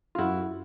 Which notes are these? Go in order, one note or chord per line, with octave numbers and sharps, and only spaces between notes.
F4
F#2 E4 F#4